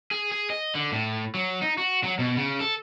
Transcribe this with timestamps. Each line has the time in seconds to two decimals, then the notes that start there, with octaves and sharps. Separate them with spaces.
0.11 G#4
0.32 G#4
0.50 D#5
0.75 D3
0.92 A2
1.35 F#3
1.62 D#4
1.78 F#4
2.04 F#3
2.19 B2
2.37 C#3
2.60 A4